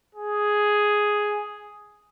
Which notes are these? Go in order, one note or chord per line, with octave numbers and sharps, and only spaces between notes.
G#4